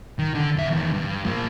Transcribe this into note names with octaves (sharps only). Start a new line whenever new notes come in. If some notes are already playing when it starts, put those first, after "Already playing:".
D#3
D3
F2 E5
E2 D#3
G2
F3 A#3